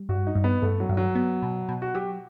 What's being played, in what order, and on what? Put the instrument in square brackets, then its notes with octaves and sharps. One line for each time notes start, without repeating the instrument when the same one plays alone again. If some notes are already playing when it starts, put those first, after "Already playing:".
Already playing: [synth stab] G3
[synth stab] G2 [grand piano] F#4
[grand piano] D#4
[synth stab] G2
[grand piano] B3
[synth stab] G2 [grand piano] A3
[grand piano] F#3
[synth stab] G2
[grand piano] F#3
[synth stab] B3
B2
B2
[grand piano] F#4
[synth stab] F#3 [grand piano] G4